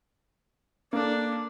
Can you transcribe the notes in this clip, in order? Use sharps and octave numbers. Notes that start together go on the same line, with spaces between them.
A#3 D4 A4